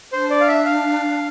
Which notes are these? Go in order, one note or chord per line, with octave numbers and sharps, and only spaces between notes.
D4 C5
D5
F5
E5
F5